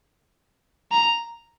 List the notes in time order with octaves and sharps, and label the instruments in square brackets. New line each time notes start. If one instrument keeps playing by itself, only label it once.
[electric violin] A#5